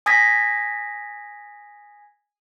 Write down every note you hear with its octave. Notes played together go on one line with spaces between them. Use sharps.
G#5 D#6 G#6 A#6 B6